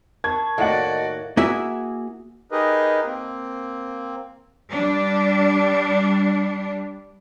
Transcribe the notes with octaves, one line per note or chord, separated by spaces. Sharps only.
A#4 A5 C#6 G#6
A2 D#3 A#3 F#4 D5 D#5 F#5
A#3 E4 F#4 G#4 E5
D#4 G4 G#4 A#4 B4 D#5
A#3 C4
G3 D4